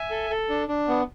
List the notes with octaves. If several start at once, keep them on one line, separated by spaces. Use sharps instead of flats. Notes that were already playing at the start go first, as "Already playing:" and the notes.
Already playing: E5 G#5
A4
A4
D4
D4
B3